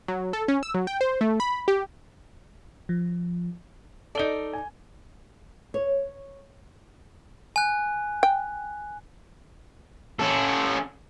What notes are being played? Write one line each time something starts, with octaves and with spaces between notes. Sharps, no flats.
F#3
A4
C#4
E6
F#3
G5
C5
A3
B5
G4
F3
D#4 A4 D5 G7
G#5
C#5
G#5 F#6
G5
C#4 A4